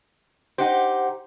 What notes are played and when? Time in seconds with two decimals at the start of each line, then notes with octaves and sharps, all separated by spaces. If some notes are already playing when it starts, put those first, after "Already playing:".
0.58 D#4 G4 C5 F#5